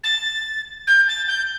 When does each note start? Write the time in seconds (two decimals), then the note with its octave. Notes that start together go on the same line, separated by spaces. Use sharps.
0.03 A6
0.87 G6
1.08 A6
1.27 G6